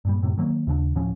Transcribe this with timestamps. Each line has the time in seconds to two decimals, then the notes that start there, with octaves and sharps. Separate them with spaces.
0.05 G2 A#2 G3
0.22 F#2 A2 C3
0.38 D#3 F#3 G3 A#3
0.67 D#2 C#3 C#4 D4
0.95 D1 A2 F3 C#4